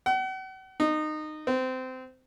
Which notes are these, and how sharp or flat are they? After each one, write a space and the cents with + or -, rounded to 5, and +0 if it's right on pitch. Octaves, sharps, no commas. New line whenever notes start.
F#5 +40
D#4 -20
C4 -20